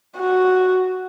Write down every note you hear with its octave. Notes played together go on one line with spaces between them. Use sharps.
F#4